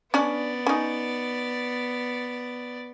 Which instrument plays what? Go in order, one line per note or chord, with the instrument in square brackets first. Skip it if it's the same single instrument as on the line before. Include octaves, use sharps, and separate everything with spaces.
[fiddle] B3 D5 [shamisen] C#4 D4
[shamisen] C#4 D#4